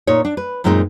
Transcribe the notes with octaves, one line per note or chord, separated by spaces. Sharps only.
A#2 D#4 C#5
D4
B4
F#2 A#2 G#3 C4 C#4 D#4